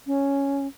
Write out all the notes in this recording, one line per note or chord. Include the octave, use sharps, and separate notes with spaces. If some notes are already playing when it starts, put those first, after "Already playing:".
C#4